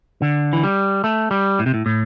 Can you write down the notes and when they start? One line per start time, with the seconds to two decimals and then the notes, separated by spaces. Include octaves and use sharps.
0.22 D3
0.53 E3
0.64 G3
1.04 A3
1.31 G3
1.59 A2
1.66 C3
1.74 A2
1.86 A2